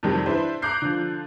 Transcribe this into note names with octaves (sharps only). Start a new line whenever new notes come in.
F2 C3 D#3 F#3 G3 C4
D4 E4 B4 C5
A#5 D6 F#6 G6 C7
D3 F3